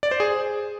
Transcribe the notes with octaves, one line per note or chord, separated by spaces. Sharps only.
D5
C5
G#4